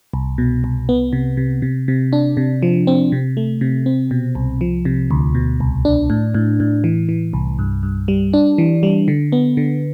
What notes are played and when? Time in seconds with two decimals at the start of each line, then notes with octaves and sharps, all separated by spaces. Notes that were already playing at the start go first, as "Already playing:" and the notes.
0.14 C2
0.38 B2
0.64 C2
0.89 B3
1.13 C3
1.37 C3
1.62 C3
1.88 C3
2.13 D4
2.37 C3
2.63 F3
2.87 C4
3.12 C3
3.37 A3
3.61 C3
3.86 C4
4.11 B2
4.35 C2
4.61 F3
4.85 C3
5.11 D2
5.35 B2
5.60 C2
5.85 D4
6.10 A2
6.34 A2
6.60 A2
6.84 E3
7.09 E3
7.33 C2
7.59 G2
7.83 G2
8.08 G3
8.33 D4
8.58 E3
8.83 G3
9.08 D3
9.32 B3
9.57 D3